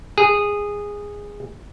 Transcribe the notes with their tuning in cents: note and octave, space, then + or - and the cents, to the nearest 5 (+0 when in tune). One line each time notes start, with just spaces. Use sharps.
G#4 -15